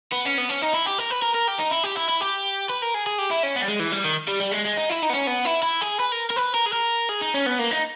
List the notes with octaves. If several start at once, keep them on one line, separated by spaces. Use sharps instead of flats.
B3
C#4
B3
C#4
D#4
E4
G4
A#4
B4
A#4
A#4
G4
D#4
E4
G4
E4
E4
G4
B4
A#4
G#4
G#4
G4
E4
C#4
B3
G3
G#3
E3
G3
D#3
G3
G3
G#3
G#3
D#4
E4
D#4
B3
C#4
B3
E4
E4
G#4
B4
A#4
A#4
B4
A#4
G#4
A#4
G#4
D#4
C#4
B3
A#3
D#4